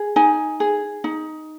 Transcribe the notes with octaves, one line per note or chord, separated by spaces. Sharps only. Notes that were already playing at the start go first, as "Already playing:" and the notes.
Already playing: G#4
D#4 G#5
G#4
D#4